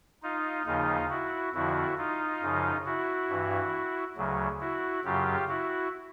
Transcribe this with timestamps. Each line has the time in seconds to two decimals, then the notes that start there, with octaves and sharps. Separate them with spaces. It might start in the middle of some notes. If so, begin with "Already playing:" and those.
0.23 D#4 F4
0.66 D#2 C#3 F3 D#4 F4
1.09 E4 F#4
1.53 F2 D3 F3 E4 F#4
1.97 D#4 F4
2.41 F#2 C#3 F3
2.85 E4 F#4
3.29 G2 E3
4.17 D2 C#3 F#3
4.60 E4 F#4
5.05 F#2 C#3 F#3 F4 G4
5.48 E4 F#4